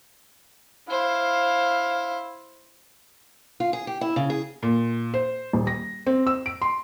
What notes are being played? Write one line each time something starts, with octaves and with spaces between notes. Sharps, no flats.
E4 C5 F5
F4
G#4
G4
E4
C#3
G#4
A#2
C5
D#1
A#6
C4
E6
D7
C6